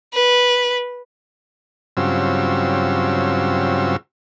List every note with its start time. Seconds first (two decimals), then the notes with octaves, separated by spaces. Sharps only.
0.14 B4
1.97 G2 C#3 F#3 C4 F4 E6